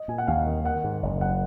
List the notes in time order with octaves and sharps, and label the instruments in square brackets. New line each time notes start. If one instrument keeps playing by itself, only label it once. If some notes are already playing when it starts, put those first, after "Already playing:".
Already playing: [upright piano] D#5
[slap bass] A#2 [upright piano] G#5
[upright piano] F#5
[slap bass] D#2 [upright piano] F5
[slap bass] D#3
[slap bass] D#3 [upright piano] F#5
[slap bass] G#2
F#1
[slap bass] F#2 [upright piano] F#5